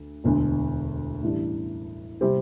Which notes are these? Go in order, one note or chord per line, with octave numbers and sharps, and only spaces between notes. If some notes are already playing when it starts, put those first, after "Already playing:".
Already playing: D2
E1 D2 D3
A1 A2 E3 G3 D4
C3 G3 C4 G4